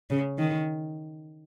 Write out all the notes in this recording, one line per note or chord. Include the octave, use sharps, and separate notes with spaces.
C#3
D#3